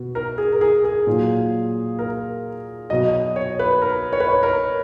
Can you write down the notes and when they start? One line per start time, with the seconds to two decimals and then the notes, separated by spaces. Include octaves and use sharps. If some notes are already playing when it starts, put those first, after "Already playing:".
Already playing: B2
0.15 A#4
0.38 G#4
0.52 A#4
0.61 G#4
0.84 G#4
1.07 A#2 F#3
1.99 A#4
2.90 B2 F#3 D#5
3.13 D#5
3.36 C#5
3.59 B4
3.82 A#4
4.13 C#5
4.20 B4
4.28 C#5
4.43 A#4